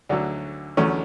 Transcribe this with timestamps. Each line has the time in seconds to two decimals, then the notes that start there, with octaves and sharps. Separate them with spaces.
0.09 D2 D3 F#3
0.77 E2 D3 F#3 A3 C#4